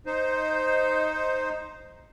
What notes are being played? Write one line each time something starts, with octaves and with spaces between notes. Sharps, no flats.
D#4 C5